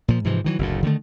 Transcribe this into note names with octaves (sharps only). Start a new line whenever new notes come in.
A#2 F3
G#2 C3 E3 F3
D#3 E3 F#3
F#1 D2 A2
D3 D#3 G3 A3